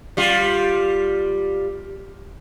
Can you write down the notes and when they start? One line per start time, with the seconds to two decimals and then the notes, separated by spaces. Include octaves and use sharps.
0.17 G3 F4